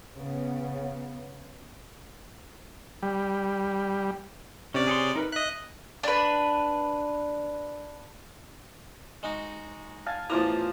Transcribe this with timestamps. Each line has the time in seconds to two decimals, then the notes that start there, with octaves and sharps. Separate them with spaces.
0.16 C#3 B3
3.03 G3
4.74 C3 C#4 D5
4.87 G#4 C#5 C6
5.16 D#4 A#4 B4
5.32 D#5 E5 F#6
6.03 D4 B4
9.23 G#3 D#4 F#4
10.06 F5 G#5 A5
10.30 A1 E2 F3 E4 F4 A#5 D6